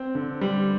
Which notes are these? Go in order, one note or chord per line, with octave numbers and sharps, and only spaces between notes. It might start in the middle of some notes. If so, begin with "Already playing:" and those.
Already playing: C4
D3
G3